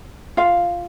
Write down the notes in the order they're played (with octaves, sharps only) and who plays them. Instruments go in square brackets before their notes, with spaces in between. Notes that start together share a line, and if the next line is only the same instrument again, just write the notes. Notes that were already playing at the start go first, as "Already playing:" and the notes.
[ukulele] F4 F5